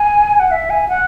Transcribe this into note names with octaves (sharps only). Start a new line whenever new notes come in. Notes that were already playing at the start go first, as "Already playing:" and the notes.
Already playing: G#5
F#5
E5
G#5
F#5